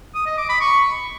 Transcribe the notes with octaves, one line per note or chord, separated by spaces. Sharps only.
D#6
D#5
D6
B5
C#6